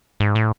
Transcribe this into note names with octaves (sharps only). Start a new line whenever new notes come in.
G#2
A2